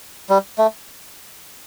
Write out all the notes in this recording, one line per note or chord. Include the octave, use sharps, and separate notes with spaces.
G3
A3